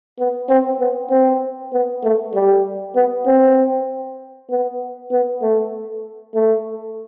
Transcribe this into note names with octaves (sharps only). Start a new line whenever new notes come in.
B3
C4
B3
C4
B3
A3
G3
B3
C4
B3
B3
A3
A3